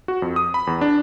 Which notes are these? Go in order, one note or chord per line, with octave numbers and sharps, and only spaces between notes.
F#4
F2
D#6
B5
E2
D4